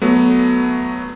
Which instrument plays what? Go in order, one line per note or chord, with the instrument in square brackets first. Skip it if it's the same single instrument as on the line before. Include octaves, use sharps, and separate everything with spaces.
[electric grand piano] F#3 A3 B3